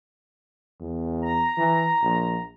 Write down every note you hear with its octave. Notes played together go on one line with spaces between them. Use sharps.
E2
A#5
E3
A#1